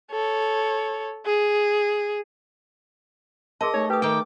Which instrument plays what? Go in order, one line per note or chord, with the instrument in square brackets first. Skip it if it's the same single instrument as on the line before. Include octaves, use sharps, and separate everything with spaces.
[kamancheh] A4 C#5
G#4
[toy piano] G#4 A#4 A5 [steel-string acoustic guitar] D#5 [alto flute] C6
[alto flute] A3 [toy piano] D#4 [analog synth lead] C#5
[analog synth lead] G4 [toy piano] B4 D#6
[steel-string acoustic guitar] D#3 G5 [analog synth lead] D6